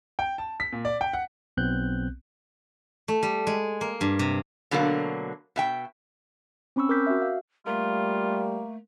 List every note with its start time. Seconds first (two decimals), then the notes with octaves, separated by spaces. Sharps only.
0.19 G5
0.38 A5
0.60 B6
0.73 A#2
0.85 D5
1.01 G5
1.13 F#5
1.57 B1 B3 C4 F#6 G6
3.08 A3
3.23 G3
3.47 G#3
3.81 A#3
4.01 G2
4.19 C3
4.71 B2 D3 F#3 A3 A#3
5.56 B2 E5 G5
6.76 C4 C#4 B5 C#6 E6
6.89 A#4 D6 E6 G6 B6
7.07 F#4 E5
7.22 F5
7.67 G3 A3 A#3 F4